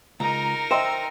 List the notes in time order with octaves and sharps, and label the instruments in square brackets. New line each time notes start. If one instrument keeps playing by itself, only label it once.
[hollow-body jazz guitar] C#2 [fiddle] D#4 A#4 [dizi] A#5
[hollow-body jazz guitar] C5 D#5 [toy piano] E5 G5 C6 [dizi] E6